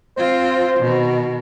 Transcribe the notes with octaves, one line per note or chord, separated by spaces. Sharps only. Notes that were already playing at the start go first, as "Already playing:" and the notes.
C4 F4 C5
B2 D#3